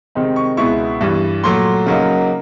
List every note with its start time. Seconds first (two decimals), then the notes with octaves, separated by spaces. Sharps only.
0.15 C3 D#3 G#3 C4 D#4
0.36 C#6
0.57 C#2 B2 G#3 B3 E4 C#6
1.01 G2 E3 G3
1.43 A#2 F#3 A3 C6
1.86 C#3 F#3 A#3 D#4